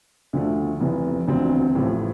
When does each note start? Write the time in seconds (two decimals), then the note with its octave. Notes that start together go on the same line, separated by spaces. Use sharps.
0.33 D2 D3 F3 A3
0.80 F1 F2 E3
1.27 E1 D2 D3 F3 C4
1.75 A1 A2 F3 A3